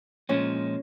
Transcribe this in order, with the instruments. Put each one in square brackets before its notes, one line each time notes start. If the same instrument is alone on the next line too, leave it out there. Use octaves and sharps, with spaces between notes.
[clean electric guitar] A#2 F3 G#3 [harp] C#4